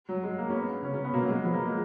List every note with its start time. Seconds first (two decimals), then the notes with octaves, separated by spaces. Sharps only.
0.09 F#3
0.23 G#3
0.38 A#3
0.50 C#4
0.54 B3
0.83 C#3 C#4
0.94 C#4
1.04 B3
1.14 B2 A#3
1.22 F#3
1.29 G#3
1.44 F3 B3
1.53 A#3
1.65 G#3